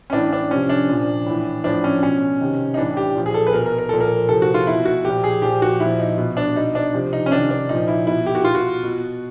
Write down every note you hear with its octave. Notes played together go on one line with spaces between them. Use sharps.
C#4
A2 E3 D4
D4
C3 F3 C#4
D4
A#2 F3
A2 E3
A2 F3 D4
C#4
B2 C#4
C3 D#3
D#4
A2 E3 D4
G4
A#2 F3
G#4
A4
B4
B2 A#4
A#4
A#4
A#2 F3 A4
A#4
C3 A4
F3
F#4
F4
B2 E4
F#4
A#2 F3 G4
G#4
A#2 F3 G4
F#4
A#2 F3 E4
D#4
B2
D4
B2 D#4
D4
C3 F3
D#4
C#4
C3 D#3 D4
D4
A#2 F3 D#4
E4
B2 E4
G4
F#4
B2 F4
F#4
B2